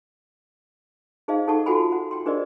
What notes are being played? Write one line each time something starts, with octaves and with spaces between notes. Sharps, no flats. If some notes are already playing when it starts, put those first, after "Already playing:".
D#4 G#4 C5 D#5 F5
D#4 G#4 A4 F#5 A5 C#6
F4 F#4 A4 F#5 G#5 B5
F#5
G5 C6
D4 G#4 A#4 C5 D5 D#5